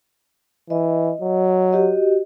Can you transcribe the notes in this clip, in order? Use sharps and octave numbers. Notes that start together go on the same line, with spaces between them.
E3 D#5
F#3
F#4 G4 D#5